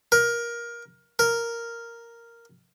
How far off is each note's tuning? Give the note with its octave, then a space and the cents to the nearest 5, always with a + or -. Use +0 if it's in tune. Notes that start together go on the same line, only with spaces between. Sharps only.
A#4 +15
A#4 -5